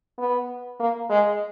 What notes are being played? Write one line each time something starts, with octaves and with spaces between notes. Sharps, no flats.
B3
A#3
G#3